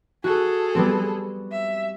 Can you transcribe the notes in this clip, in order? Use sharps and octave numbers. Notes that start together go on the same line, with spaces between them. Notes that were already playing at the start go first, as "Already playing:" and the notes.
F#4 G#4 A4
G3 B3 C4
E5